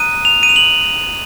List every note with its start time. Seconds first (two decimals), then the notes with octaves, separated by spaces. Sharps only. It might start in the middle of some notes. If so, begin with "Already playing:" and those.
Already playing: A#5 D#6 F#6 D#7
0.25 F7
0.43 D#7
0.49 F7
0.56 F#7